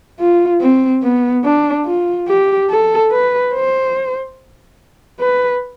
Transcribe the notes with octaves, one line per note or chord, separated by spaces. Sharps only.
F4
C4
B3
D4
F4
G4
A4
B4
C5
B4